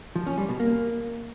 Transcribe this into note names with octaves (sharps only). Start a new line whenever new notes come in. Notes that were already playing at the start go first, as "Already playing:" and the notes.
F3
C#4
G3
B2
A#3